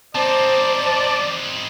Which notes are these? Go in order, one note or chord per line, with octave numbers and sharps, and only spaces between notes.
C4 D#4 C5 D5 A5